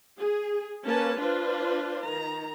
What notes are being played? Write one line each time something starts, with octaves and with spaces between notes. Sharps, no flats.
G#4
A#3 C#4 B4 A5
D4 F4 B4 C5
D#3 A#5